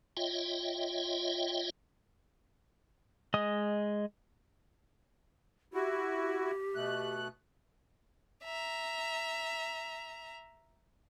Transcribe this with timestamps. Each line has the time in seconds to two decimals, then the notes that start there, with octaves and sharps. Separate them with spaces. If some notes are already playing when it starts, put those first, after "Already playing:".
0.17 F4 C#5 D#5 E5 G5
3.34 G#3 D#5 D#6
5.74 E4 F#4 G4
6.75 B2 A3 F#6
8.44 E5 A#5